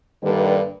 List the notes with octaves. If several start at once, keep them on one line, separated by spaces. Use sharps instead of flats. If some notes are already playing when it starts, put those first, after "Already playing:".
G2 D3 D#3 G3 A#3 B4